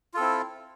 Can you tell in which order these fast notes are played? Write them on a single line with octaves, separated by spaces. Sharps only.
F4 A4 C4 E4